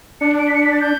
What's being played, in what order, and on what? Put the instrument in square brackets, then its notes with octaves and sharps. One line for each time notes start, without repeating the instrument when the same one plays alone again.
[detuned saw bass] D4 [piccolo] C#7
[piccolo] D7
B6
C#7
B6
A6
G6